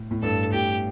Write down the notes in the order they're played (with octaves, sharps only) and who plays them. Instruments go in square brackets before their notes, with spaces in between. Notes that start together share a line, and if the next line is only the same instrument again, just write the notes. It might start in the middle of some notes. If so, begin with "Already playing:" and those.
Already playing: [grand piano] A2
A2
[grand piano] G2 [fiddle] A4
[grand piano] A2 [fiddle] G4